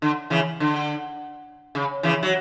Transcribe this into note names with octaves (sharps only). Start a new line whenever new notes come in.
D3
C#3 E3
D3
C#3
C#3 E3
F#3